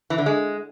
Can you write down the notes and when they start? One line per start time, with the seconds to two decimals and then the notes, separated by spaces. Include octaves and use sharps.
0.10 E3
0.18 D3
0.26 G#3